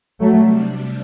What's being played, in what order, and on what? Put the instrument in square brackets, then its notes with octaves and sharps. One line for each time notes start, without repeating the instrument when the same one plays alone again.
[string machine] C3 G3 D4 [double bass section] F#3 A3